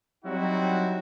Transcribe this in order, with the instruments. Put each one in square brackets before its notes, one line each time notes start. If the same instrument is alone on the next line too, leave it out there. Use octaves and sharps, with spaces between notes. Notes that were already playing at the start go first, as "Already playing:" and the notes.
[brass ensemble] F#3 G3 C4 D#4 E4 F#4